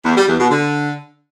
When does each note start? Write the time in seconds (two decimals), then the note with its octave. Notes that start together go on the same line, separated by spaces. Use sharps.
0.05 E2
0.16 G3
0.27 E2
0.39 B2
0.50 D3